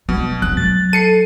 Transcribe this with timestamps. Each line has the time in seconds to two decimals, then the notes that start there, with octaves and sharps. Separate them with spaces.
0.09 B2 G3
0.42 F2 F#6
0.57 F#3 A6
0.93 A4 C7 C#7 D#7